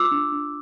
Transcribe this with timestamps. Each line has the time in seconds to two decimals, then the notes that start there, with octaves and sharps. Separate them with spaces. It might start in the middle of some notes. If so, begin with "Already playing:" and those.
Already playing: F4 D6 E6
0.11 D4
0.32 D4